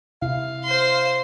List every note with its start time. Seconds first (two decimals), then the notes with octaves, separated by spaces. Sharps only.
0.22 C3 E4 F5
0.64 C5 C6